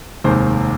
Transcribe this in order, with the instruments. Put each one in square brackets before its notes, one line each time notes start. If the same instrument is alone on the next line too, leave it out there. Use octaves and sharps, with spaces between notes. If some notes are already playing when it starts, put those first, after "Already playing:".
[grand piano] F1 D#2 D#3 G#3 C5